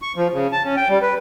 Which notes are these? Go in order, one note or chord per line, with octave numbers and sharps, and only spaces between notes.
C#6
F3
C#3
A5
C#4
G5
G3
B4